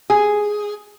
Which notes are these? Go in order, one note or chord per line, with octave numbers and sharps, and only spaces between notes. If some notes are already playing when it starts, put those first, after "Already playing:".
G#4